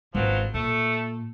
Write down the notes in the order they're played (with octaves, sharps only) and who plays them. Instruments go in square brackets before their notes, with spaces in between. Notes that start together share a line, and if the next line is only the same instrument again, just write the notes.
[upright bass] G#1 [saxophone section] G2 F3 F#3
[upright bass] A#2 [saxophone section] A3